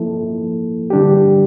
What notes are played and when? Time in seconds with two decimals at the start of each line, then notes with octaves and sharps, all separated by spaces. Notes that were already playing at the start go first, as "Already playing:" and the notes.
Already playing: F3 A#3 E4 A4
0.90 D3 G3 D4 G4